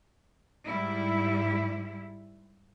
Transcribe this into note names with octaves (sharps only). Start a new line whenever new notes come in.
G#2 G3 E4